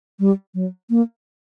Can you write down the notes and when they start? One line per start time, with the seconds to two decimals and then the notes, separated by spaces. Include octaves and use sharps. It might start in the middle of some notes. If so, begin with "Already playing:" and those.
0.20 G3
0.54 F#3
0.90 A#3